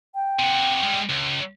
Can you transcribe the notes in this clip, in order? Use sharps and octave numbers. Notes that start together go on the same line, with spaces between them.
G5
C3 F#4
G3 G#3
C#2